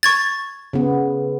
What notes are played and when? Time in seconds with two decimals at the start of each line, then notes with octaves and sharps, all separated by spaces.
0.03 C#6 G#6 A6
0.73 C#3 B3